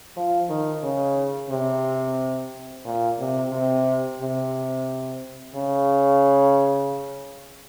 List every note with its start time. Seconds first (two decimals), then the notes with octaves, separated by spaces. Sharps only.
0.16 F3
0.49 D#3
0.83 C#3
1.50 C3
2.85 A#2
3.19 C3
3.52 C3
4.21 C3
5.55 C#3